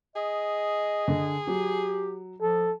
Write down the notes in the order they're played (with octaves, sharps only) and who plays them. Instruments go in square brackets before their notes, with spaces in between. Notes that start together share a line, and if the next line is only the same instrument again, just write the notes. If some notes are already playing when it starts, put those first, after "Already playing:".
[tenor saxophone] G#4 [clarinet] D#5
[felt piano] D3
[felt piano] F#3 [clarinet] G4
[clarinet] F3 [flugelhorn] A4